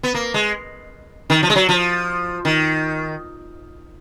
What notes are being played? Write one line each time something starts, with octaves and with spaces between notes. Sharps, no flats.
B3
A#3
G#3
D#3
F3
G#3
F#3
F3
D#3